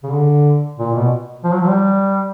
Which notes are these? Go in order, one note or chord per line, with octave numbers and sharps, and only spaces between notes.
C#3
D3
A#2
B2
F3
F#3
F3
G3